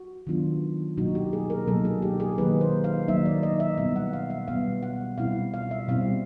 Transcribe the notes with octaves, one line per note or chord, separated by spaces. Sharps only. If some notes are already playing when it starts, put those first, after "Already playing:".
Already playing: F#4
D#3 F#3 B3 D4 F4
B2 F#3 A#3 D#4 F#4
G4
G#4
A#4
B2 F#3 A#3 D#4 A4
G#4
G4
G#4
D#3 F#3 A#3 D#4 B4
C5
F5
D#3 F#3 A#3 D#4 E5
D5
D#5
E5
B2 G3 B3 E5
F#5
F5
E5
B2 G3 B3 F5
F#5
B2 G3 C4 E4 F5
F5
E5
B2 G3 C4 E4 F5